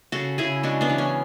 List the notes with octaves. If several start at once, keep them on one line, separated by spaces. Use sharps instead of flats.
C#3 F#4 A4
C#3 E4 G#4
G#3 D4 F#4
B3 D4
E3
C#4